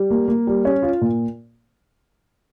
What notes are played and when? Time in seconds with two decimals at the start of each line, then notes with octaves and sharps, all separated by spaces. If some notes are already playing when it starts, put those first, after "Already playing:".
Already playing: G3
0.10 A#3
0.28 A#3
0.47 G3
0.65 C#4
0.82 F4
1.01 A#2